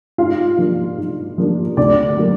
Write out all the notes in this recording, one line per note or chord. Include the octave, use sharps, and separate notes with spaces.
G#2 F4 F5
F3 A#3 D4
G#2
F3 A#3 D4
D2 D5
D3 F#3 A#3